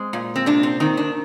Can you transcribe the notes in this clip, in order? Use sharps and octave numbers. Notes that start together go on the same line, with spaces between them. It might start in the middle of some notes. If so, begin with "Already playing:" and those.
Already playing: G#3 C4
A#2
C4
C3 D4
C4
D#3 C4
D4